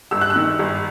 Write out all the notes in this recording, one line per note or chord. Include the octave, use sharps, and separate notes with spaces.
G1 E6
F#6
E6
D#3
G1